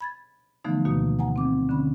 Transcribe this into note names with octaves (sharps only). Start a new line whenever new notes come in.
B5 G#6 A6
D3 E3 F3 A3 B3 D#4
D2 B2 D#3 A#3 F#4 D#6
F#5 G#5 A#5
C4 D6
D3 C#4 B5